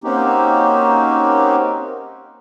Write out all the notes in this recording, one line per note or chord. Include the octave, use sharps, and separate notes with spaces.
A#3 C4 C#4 D#4 F#4 G4